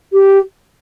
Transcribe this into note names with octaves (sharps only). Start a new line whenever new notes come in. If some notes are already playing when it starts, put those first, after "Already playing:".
G4